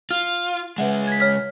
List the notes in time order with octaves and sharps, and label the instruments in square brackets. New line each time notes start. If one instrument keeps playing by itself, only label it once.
[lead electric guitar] F4 [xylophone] F6
[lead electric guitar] C#3 G#3 [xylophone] B4 E5 F#5
[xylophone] G#6 B6
C#5 F6 B6